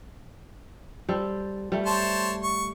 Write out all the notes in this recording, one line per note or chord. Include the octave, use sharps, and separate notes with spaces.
G3 A4 C5
G3 A3
C5 C#5 A5
C#6